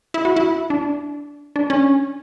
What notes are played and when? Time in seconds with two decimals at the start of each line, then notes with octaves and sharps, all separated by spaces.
0.14 E4
0.25 F#4
0.36 E4
0.70 D4
1.56 D4
1.70 C#4